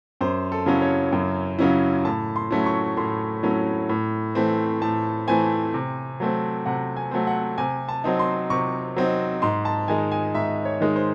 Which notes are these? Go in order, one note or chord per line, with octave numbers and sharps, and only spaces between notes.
F#2 C5
A4
C#3 F#3 C#4 E4
C#5
F#2
C#3 F#3 C#4 E4
A2 A5
C6
F#3 A3 C#4 E4
C#6
A2 C6
F#3 A3 C#4 E4
A2
E3 A3 C4
A2 A5
E3 A3 C4 G#5
C3
F#3 A3 C4
C3 F#5
G#5
F#3 A3 C4
F#5
C3 G#5
A5
F#3 C4 D#4
C6
C3 C#6
F#3 C4 D#4
G#2 C6
A5
D#3 G#3 D#4 G#5
G#5
G#2 E5
C#5
D#3 G#3 D#4
C5